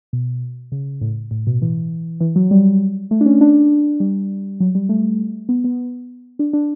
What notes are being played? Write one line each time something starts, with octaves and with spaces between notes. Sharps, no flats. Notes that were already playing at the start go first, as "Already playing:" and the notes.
B2
C#3
A2
A2
B2
E3
E3
F#3
G3
A3
D4
C#4
D4
G3
F#3
G3
A3
B3
B3
D4
D4